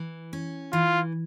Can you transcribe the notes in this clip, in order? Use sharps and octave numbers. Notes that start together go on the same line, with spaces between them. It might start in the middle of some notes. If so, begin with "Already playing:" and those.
Already playing: E3
C#4
E3 F4